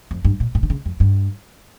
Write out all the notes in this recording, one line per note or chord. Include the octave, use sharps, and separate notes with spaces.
F2
G2
A#2
A2
D3
C#3
F2
G2